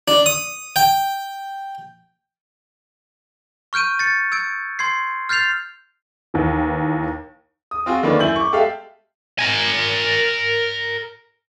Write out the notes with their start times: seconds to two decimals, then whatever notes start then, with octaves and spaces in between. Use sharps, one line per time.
0.08 D4
0.26 D#6
0.76 G5
3.73 C#6 F6 G6 D7 D#7
3.99 A6 C#7
4.32 E6 G#6 D7
4.79 C6 G#6 C7
5.29 F6 G6 A6 C7 F7
6.34 D#2 E3
7.71 D#6
7.86 C4 F4 F#4 G#4
8.03 D3 D#3 A#3 C#4 B4 D5
8.19 F#2 E4 G6 F#7
8.36 C#6 D6
8.52 G#3 G4 A4 E5 F5
9.39 A#4 G#5